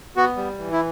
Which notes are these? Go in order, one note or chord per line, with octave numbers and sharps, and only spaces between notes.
B3 F#4
G3
E3
E4